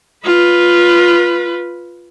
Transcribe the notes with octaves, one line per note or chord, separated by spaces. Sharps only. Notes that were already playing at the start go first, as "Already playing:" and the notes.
F4 B4